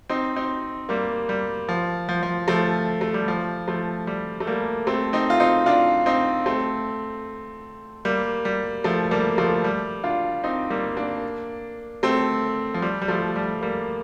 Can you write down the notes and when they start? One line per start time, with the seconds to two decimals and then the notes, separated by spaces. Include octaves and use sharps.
0.10 C4 D#4
0.36 C4 D#4
0.89 G3 A#3
1.29 G3
1.69 F3
2.09 F3
2.23 F3
2.48 F3 A3
3.01 A3
3.14 G3
3.28 F3
3.68 F3 A3
4.07 G3
4.40 A3
4.47 G3 A#3
4.87 A3 C4
5.13 C4 D#4
5.30 F4
5.40 C4 D#4
5.66 D4 F4
6.06 C4 D#4
6.46 A3 C4
8.05 G3 A#3
8.45 G3
8.84 F3 A3
9.11 G3 A#3
9.38 F3 A3
9.64 G3
10.04 D4 F4
10.44 C4 D#4
10.70 G3 A#3
10.97 A#3 D4
12.03 A3 C4
12.74 F3
12.82 G3
13.02 G3
13.08 F3 A3
13.36 G3
13.62 G3 A#3